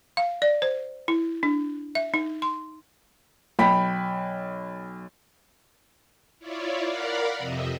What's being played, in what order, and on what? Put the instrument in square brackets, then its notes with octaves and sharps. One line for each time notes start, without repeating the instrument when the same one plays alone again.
[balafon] F5
D5
C5
E4
D4
E5
D#4
C6
[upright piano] B1 G5 B5 B6
[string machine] E4 F4 C#5 D5
A#4 D5 F5 F#5 B5
F2 C3 D#5 E5